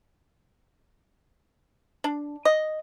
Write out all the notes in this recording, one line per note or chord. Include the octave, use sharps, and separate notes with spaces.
D4
D#5